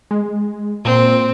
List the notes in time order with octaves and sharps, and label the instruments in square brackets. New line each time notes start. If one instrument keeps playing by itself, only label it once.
[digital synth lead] G#3
[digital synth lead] A#2 [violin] C4